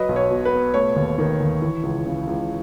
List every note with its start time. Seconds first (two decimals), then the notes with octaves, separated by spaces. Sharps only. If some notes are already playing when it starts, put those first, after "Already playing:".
Already playing: F#3 B4 D#5
0.09 B1
0.16 C#5
0.31 B2
0.45 B4
0.53 B3
0.74 A3 C#5
0.96 D#2
1.18 D#3
1.40 D#2
1.62 E3
1.83 C#2
2.06 C#3
2.27 C#2